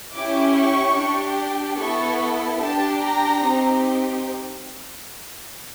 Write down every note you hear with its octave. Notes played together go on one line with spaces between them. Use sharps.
C#4 E4 G4 D6
C#6
D4 G4
B3 E4 A4 C#6
D4 G4 A5
A#5
C4 D#4 G4